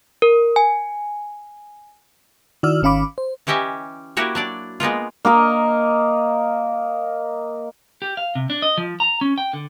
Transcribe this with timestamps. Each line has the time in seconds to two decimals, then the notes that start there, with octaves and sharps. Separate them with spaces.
0.22 A#4
0.56 G#5
2.63 D#3 E4 F#4 D5 E6 F6
2.82 G#1 D#3 C#4 F5 B5 D6
3.18 C5
3.47 E3 C#4 G4 D#5 E5
4.17 A#3 E4 F#4 G4 C#5
4.35 F#3 D4 D5
4.80 G#3 A#3 B3 F4
5.25 A#3 A#4 D#5
8.02 G4
8.17 F5
8.35 C3
8.50 D4
8.62 D#5
8.78 F3
9.00 A#5
9.21 C#4
9.38 G5
9.53 D3